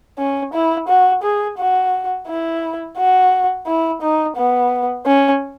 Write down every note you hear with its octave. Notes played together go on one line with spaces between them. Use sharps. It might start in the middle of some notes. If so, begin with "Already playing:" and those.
C#4
E4
F#4
G#4
F#4
E4
F#4
E4
D#4
B3
C#4